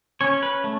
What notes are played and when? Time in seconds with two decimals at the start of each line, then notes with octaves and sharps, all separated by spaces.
0.21 C#4 C#5
0.43 B4
0.64 A3